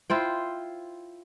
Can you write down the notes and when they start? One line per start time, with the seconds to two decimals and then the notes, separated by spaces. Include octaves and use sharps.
0.10 E4 F4 C5 G5